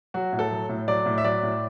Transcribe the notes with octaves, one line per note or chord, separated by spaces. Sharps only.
F#3 F#4
A2
A4
F#3
A2
F#3 D5
A2
E5
F#3 D5
A2